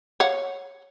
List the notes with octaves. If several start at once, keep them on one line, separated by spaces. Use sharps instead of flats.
C#5 F5 F#5